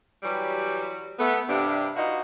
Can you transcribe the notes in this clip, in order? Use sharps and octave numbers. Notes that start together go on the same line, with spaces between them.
E3 F#3 G3
A3 B3
G2 C3 G3 D4
B2 D#4 F4 F#4